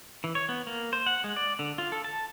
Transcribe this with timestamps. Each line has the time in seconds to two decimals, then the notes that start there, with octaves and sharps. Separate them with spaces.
0.24 E3
0.35 C#5
0.49 B3
0.67 A#3
0.93 C5
1.06 F#5
1.24 G#3
1.36 D5
1.59 D3
1.78 F4
1.92 A4
2.05 A5